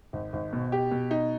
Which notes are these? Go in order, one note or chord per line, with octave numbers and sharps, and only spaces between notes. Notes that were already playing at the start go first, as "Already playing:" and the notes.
G#1
G#1
B2
G4
B2
D#4